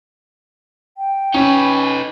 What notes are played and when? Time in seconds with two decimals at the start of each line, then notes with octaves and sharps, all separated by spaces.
0.98 G5
1.34 C#4 D#4 B4